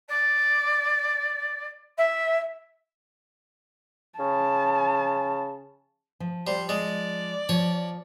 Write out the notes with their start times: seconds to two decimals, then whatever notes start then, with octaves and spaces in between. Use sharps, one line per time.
0.08 D5
1.97 E5
4.19 C#3 A5
6.20 F3
6.47 G3 C5
6.69 G#3 D5
7.49 F3 C#5